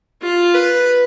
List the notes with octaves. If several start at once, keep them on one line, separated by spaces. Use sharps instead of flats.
F4
B4